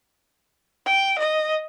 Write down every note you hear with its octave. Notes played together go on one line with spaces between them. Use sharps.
G5
D#5